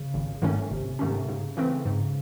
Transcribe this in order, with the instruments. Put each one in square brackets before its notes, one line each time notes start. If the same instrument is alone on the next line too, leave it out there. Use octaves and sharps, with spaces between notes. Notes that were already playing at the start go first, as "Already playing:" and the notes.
Already playing: [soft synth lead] C#3
[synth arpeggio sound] G#1
G#2 D#3 A3 C#4
[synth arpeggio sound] G#1 [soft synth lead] C3
[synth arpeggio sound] G#2 D#3 A3 C#4 [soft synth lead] C3
[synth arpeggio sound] G#2 [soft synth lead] C#3
[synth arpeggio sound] E3 A3 C4
G#2